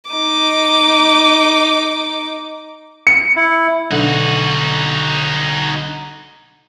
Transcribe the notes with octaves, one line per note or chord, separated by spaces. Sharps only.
D#4 D6
C#7
E4
B1 D3 D#4 F#4